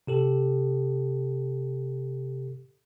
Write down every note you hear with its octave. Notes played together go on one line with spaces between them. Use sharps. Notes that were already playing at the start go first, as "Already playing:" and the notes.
C3 G4 A4